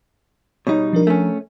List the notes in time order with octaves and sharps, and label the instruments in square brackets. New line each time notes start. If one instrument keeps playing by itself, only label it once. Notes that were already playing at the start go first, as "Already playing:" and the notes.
[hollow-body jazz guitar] B2 G3 D#4 [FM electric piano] C#5
[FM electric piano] F3 D4 A#4
[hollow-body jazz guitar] A3 C#4